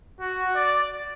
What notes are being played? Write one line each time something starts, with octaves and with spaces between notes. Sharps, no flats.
F#4
D5